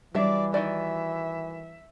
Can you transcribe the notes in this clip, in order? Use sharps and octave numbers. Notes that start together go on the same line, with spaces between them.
E3 F#3 G3 D4 D5 E5
D#3 F#4 D5 E5